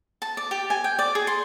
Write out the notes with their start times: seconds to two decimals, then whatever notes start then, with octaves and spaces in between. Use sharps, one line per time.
0.22 A5
0.37 D5
0.51 G4
0.70 G#5
0.84 G5
0.99 D5
1.15 G#4
1.27 C6